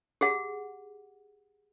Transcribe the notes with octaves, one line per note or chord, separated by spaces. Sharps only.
G4 G#4 F#5